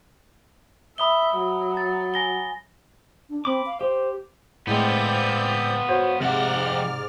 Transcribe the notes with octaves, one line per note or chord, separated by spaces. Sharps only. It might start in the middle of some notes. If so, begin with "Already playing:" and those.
E5 B5 D#6 G7
F#3
A6
G#5 A#6 G7
D4
C4 B5 D6
F5
G4 C5
A2 G#3 B3 C4 F4 D5 G5 G6
F#4 C5 C#5
F2 G#2 C3 D5 F#5 F6